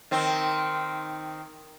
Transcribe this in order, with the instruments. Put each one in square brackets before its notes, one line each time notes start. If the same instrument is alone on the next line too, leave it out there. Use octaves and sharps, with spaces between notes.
[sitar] D#3 C4